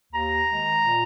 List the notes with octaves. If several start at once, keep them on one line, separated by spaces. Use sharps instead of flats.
D#2 A#5
D#3 G#3
A#2